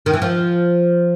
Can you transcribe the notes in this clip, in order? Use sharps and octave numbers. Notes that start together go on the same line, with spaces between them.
D#3
E3
F3